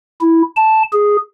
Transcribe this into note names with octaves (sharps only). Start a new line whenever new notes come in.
E4
A5
G#4